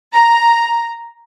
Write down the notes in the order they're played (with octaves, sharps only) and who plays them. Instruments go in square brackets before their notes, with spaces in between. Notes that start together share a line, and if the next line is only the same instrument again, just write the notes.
[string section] A#5